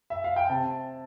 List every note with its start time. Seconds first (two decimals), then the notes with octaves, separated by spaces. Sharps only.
0.10 E5
0.24 F5
0.36 G5
0.50 C3 A5